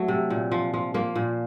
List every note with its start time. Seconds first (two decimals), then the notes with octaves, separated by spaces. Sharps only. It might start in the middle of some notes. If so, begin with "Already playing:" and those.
Already playing: F#3 A3
0.08 C3
0.30 A#2
0.52 F3
0.74 F3
0.94 F3 A#3
1.16 A#2